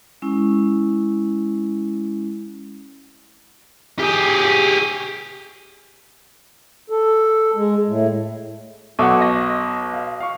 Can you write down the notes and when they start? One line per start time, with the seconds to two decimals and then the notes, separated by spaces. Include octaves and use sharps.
0.22 G#3 C#4 E4
3.99 G4 G#4
6.90 A4
7.55 G#3
7.87 A2
8.99 B1 A4 F#5 C#6 D6
9.20 D#5 A#6
9.94 F5
10.20 F5 C#6